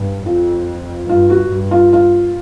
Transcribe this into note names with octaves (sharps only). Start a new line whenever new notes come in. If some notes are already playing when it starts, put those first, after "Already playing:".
Already playing: G2
F2 F4
G2 F4
F#4
G2
F4
F4